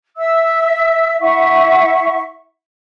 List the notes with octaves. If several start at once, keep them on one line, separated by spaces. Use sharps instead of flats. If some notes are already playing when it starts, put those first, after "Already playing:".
E5 E6
E4 E5 F#5 C#6